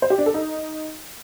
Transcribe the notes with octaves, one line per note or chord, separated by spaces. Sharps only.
C5
G4
D4
A4
D#4